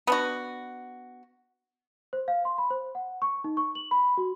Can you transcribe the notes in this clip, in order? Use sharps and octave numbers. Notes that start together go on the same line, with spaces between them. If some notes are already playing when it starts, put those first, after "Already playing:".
B3 D4 F#4
C5
F5
C6
B5
C5
F#5
C#6
D#4
C#6
F#7
B5
F#4